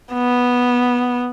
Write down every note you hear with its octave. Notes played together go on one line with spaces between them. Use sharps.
B3